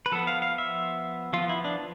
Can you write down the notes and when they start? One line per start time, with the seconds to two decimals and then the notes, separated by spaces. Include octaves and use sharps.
0.06 B4
0.12 F3 B3 A4
0.27 F5
0.42 F5
0.58 E5
1.33 F3 B3 F4
1.49 E4
1.65 D4